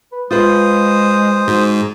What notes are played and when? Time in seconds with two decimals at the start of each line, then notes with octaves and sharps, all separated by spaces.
0.13 B4
0.31 G#3 F4 B4 C5 D#6
1.48 G#2 F#4